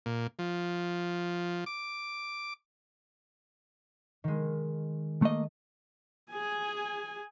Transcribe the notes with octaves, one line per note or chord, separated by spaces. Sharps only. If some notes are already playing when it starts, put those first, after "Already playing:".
A#2
F3
D6
D#3 G#3
A3 A#3 D#5
G#4 G#5